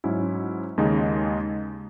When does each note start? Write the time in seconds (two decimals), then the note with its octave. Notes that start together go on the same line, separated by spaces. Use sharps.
0.04 G#2 F#3 C#4 E4
0.77 D#2 C#3 G#3 D#4